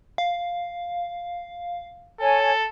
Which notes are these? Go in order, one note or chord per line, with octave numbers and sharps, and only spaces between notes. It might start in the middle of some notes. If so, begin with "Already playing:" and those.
F5
A4 C#5 G#5